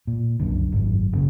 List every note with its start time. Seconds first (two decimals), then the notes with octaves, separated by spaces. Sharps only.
0.07 A#2
0.40 C2 F#2 D3
0.72 G#1 F#2
1.13 F#1 F#2 A#2 C#3